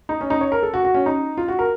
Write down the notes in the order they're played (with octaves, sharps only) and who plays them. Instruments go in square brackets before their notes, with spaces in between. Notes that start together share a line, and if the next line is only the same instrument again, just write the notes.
[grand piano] D#4
C#4
D#4
C#5
A#4
A4
F#4
F#4
C#4
D#4
F4
F#4
A#4